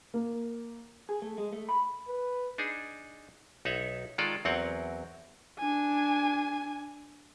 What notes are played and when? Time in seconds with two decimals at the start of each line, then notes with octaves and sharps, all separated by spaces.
0.14 A#3
1.09 G#4
1.22 A3
1.38 G#3
1.53 A3
1.69 B5
2.07 B4
2.58 D4 D#4 G#4
3.65 B1 D#4 C#5 E5 F#5
4.18 D#3 G#3 F4 A4 D5
4.45 E2 F#3 C4 A#4 F#5
5.59 D4 G#5